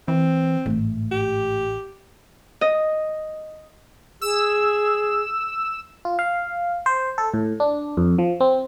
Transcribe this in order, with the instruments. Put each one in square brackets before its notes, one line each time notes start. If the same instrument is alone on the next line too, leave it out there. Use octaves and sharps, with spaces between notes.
[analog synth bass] E3 [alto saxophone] C4
[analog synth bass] A1 [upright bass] G#2 A3
[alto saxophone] G4
[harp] D#5
[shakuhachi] G#4 [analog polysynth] E6
[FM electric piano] F4
F5
C5
A4
A2
D4
F2
F3
C4